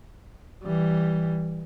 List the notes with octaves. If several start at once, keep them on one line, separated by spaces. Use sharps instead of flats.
E3 G3